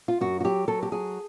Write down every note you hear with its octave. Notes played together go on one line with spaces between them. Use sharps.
F4
F#2 F#4
F#4
F#3 G4
F#3 A4
G4
F#3 G#4